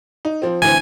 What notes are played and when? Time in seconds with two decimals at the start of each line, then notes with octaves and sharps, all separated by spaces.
0.25 D#4
0.42 F3 C4
0.62 D2 E3 C4 G#5